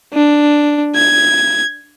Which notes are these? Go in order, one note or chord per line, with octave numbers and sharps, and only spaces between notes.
D4
G#6